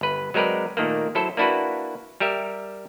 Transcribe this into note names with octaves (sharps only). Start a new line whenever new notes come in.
G1 B4
F#3 G#3 C4 A#4 B4 D5
A#2 D#3 A3 A#3
F#3 E4 A4 C5
A#3 D4 E4 F#4 B4
G3 G4 A#4 E5